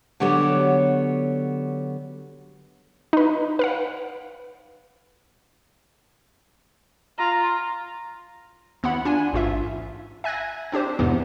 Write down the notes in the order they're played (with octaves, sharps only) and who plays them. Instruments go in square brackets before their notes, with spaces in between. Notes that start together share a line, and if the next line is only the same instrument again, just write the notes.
[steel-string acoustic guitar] D3 F#3 B3 G4 A4 C#5
[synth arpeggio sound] D#4 B4
B4 F5 F#5
[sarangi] F4 [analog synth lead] A#5
[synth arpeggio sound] D#2 B3 E4 F#5 B5
D4 F4 G#5
A1 G#2 F4 E5
E5 G#5 F#6 G#6 A#6
C4 D4 G4 C5
E2 G#2 C3 E3 B3